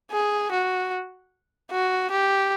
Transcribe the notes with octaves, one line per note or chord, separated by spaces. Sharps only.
G#4
F#4
F#4
G4